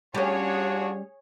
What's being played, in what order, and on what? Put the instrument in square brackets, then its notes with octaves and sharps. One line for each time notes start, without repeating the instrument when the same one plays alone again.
[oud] G3 C#4 [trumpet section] D4 F4 F#4 [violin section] G#4 C#5